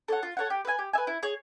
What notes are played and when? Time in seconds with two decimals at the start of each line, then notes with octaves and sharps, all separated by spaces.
0.08 A4 C#5 F#5
0.23 F4
0.37 A4 C#5 F#5
0.50 G4
0.65 B4 E5 G#5
0.79 G4
0.93 E5 G#5
0.98 B4
1.07 E4
1.23 G#4 C#5